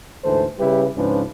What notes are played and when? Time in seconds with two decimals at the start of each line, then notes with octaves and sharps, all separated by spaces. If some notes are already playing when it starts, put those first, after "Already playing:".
0.24 D2 G#2 E3 A4 C5
0.59 C#3 G3 E4 G4 B4
0.96 C#2 G#2 F3 C#4 D4 B4